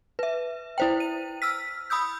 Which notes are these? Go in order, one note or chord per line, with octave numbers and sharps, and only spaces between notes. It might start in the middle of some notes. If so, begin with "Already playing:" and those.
B4 E5
E4 C5 G5
D#7
E6 F6 B6
B5 D#6 E6 G6